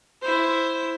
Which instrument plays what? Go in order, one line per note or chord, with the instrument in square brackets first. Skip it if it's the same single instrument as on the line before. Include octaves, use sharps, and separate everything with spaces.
[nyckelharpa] E4 C5